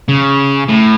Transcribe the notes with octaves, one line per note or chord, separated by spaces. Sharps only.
C#3
A2